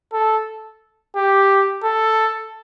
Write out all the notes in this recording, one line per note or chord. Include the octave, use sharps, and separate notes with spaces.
A4
G4
A4